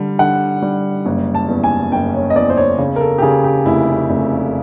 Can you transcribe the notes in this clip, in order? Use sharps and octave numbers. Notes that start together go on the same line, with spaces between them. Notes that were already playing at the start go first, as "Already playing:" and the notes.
Already playing: D3 G3
D3 F#5
G3
F#1
A5
E2
G#5
F#1 G5
C#5
D#5
E2 D5
C5
C#5
C#3
A#4
A4
G4
C#3 G#4
G4
F1 E4
F1